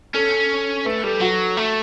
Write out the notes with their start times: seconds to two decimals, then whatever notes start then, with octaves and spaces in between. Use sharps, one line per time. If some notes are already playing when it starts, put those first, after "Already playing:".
0.14 C#4 A4
0.85 A3 B4
1.03 G3 A4
1.20 F#3 F#4
1.57 A3